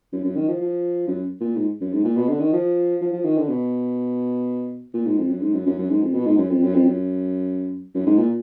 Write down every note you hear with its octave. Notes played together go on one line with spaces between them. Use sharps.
F#2
F#2
D#3
F3
F3
F#2
A#2
G#2
F#2
G#2
A#2
B2
D3
D#3
F3
F3
F3
D#3
D3
B2
A#2
G#2
F2
F#2
G#2
F#2
F#2
F#2
G#2
F2
B2
G#2
F#2
F2
F#2
F2
F#2
F#2
G#2
A#2